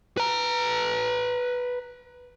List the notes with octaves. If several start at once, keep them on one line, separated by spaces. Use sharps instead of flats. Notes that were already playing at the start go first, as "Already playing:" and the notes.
B4 A#5